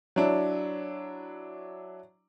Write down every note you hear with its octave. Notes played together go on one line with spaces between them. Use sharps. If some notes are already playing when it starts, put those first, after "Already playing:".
F#3 D4 E4